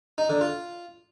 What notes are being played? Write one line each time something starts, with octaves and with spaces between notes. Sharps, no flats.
D#4
D3
F4